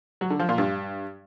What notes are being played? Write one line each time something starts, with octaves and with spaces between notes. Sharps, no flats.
F#3
D3
F3
A#2
G2